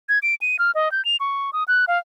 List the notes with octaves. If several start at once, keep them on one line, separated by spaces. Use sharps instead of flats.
G#6
D7
D#7
F6
D#5
G6
F7
C#6
D#6
F#6
F5